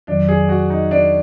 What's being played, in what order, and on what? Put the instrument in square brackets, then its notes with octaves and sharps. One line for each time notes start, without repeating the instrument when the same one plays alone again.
[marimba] F2 D#3 F#3 [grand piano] D4
[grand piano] G#4
F#4
D#4
D4